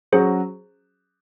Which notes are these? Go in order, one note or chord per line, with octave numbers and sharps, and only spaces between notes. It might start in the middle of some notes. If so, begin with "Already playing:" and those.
F#3 C#4 F#4 G#4 C5